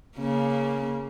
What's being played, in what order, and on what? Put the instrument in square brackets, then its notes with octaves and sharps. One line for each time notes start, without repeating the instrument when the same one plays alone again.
[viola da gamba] C#3 A#3